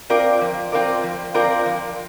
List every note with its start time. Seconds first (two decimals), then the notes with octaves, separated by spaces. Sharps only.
0.10 C4 F4 A#4 D5
0.41 F3
0.72 C4 F4 A#4 D5
1.03 F3
1.34 C4 F4 A#4 D5
1.66 F3